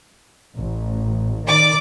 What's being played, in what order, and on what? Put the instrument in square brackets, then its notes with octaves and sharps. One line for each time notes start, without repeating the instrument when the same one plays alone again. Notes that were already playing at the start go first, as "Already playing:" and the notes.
[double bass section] A1
[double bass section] D#3 [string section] D5 D6